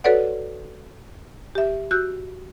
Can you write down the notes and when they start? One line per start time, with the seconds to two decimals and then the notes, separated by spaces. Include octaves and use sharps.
0.04 F#4 A4 B4 C#5 D5 F#5
1.55 G4 E5
1.91 F#4 E6 F#6 G6